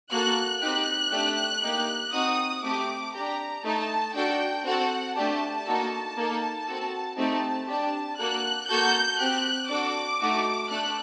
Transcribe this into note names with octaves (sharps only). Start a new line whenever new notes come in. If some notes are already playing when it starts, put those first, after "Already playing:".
A#3 F#4 A4 F#6
C4 D#4 G4 F#6
A3 D4 G4
A#3 D#4 G4
C4 D#4 F#4 D#6
A3 C4 G4 D6
D4 G4 A#5
A3 D#4 A4 A5
D4 F#4 A4 G5
C4 F#4 A4 F#5
A3 D4 G4 A5
A#3 D#4 F#4 A4
A#3 D#4 A4
C4 F#4 A4
A3 C4 D#4 G4 A5
D4 G4 A5
A#3 F#4 A4 F#6
A#3 F#4 A4 G6
C4 G4 F#6
D4 F#4 A4 D6
A3 D#4 F#4 A4
A3 D4 A4 F#6